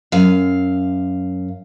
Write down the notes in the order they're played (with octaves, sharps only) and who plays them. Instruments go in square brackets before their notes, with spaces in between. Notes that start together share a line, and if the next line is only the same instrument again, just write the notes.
[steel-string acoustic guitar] F#2 F5